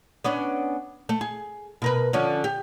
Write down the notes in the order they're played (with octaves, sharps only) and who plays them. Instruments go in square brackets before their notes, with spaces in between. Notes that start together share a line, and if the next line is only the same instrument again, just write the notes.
[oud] B3 C#4 D4
A3
G#4
B2 A#4 B4
D3 F3 C#4
G4